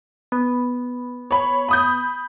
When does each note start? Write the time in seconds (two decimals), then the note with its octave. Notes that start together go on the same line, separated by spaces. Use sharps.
0.32 B3
1.31 C#5 B5
1.69 B5 D#6 G6